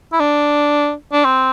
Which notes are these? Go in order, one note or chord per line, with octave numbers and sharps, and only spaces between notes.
E4
D4
D4
C4